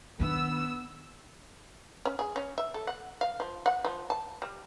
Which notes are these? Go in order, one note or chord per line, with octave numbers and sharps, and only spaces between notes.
D#3 B3 D4 E6
C#4
G#4
C#4
E5
A4
F#5
F5
F3
F#5
F3
A5
G3